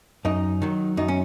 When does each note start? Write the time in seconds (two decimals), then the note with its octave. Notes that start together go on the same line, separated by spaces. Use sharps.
0.25 F#2 D#4
0.62 D#3 F#3
0.97 F#2 D#4
1.08 C#4